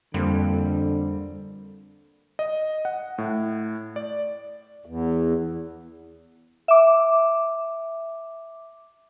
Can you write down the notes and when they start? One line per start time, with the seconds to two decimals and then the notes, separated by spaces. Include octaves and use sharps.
0.14 F2 D3 G3 A#3 C4
2.39 D#5
2.85 F#5
3.18 A2
3.96 D5
4.86 E2
6.68 E5 D6